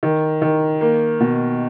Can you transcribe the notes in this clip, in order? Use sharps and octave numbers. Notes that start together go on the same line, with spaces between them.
D#3
D#3
A#3
B2